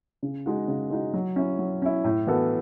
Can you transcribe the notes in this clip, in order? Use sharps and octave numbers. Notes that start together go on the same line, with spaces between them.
C#3
G#3 D#4 F#4
C#3
G#3 D#4 F#4
F#3
C#4 E4
F#3
C#4 E4
A2
E3 B3 F#4 A4